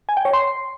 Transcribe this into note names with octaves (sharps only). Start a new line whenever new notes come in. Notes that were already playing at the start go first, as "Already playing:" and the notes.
G#5
G5
C#5
C6